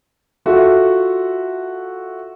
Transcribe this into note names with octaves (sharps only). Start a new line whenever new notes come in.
F4 F#4 A4 E5